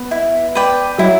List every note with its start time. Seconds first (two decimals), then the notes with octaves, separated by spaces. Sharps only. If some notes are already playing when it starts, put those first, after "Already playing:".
Already playing: B3
0.11 E4
0.55 B4 D5 G5
0.98 F#3 E4